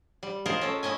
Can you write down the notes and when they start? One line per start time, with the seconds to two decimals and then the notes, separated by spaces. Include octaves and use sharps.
0.23 G3
0.46 F4 G#4 A#4 C5 D#5
0.61 C#4 A4
0.83 C#4 E4 D#5 G#5